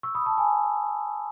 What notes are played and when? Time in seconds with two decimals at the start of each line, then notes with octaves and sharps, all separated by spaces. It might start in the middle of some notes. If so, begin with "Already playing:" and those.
0.03 C#6 E6
0.15 B5 D#6
0.26 A5 C#6
0.38 G#5 B5